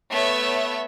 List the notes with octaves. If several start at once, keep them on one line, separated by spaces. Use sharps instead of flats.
A3 B3 C#5 E5